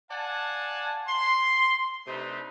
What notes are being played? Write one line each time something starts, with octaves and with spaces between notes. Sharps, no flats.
D5 F5 F#5 G#5 A5
C6
C3 A3 D4 D#4 B4 C5